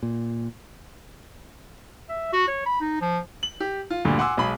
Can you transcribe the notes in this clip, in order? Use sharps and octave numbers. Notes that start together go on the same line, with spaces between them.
A#2
E5
F#4
C#5
B5
D#4
F3
F#7
G4
F4
D2 G2 A#2 D3
F#5 G#5 C6 D6 E6
B1 G#3 G#4 B5